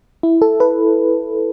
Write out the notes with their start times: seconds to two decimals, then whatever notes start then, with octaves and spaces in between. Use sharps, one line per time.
0.23 E4
0.42 A4
0.60 B4